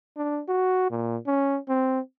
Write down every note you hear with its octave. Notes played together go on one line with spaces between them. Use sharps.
D4
F#4
A#2
C#4
C4